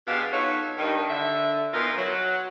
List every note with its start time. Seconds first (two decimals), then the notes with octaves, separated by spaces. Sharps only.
0.07 B2 G#3 B3 D4 G4 F5
0.32 B3 D#4 F4 F#4 A4 C#5
0.77 G2 D#3
1.09 D3 E5
1.74 B2 E3 D#4 F4 A#4
1.97 F#3